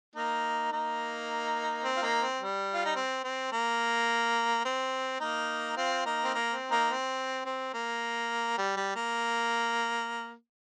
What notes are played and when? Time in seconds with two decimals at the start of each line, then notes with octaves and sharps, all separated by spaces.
0.15 A#3 D#4
0.72 A#3 D#4
1.84 C4
1.96 F4
2.02 A#3 D#4
2.21 C4
2.40 G3
2.74 F4
2.85 D#4
2.96 C4
3.24 C4
3.52 A#3
4.65 C4
5.21 A#3 D#4
5.77 C4 F4
6.05 A#3 D#4
6.24 C4
6.34 A#3
6.53 C4
6.71 A#3 D#4
6.89 C4
7.45 C4
7.73 A#3
8.58 G3
8.77 G3
8.96 A#3